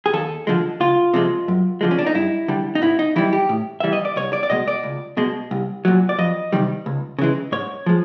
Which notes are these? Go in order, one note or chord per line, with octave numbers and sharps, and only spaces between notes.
G#4
D#2 A4
D3 F3 G#3
C#2 F4
C3 F3 G#3
F#2
D3 F3 G#3
C#4
D4
D#4
G2 E4
D3 G3
D#4
G#2 E4
D#4
E3 G3 E4
G4
A2
E3 G3 E5
D#5
D5
C2 C#5
D5
D5
B2 G#3 D#5
D5
C#2
B2 G#3
C2
A#2 F#3
D5
F2 D#5
C3 D#3 G3
C#2
C#3 E3 G#3
G#2 C#5
F3 G#3